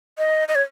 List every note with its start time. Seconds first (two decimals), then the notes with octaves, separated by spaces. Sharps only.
0.18 D#5
0.48 D#5
0.55 C#5